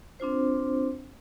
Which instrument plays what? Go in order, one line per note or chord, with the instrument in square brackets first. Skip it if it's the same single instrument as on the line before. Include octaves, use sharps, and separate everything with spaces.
[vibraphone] C4 D4 F4 C5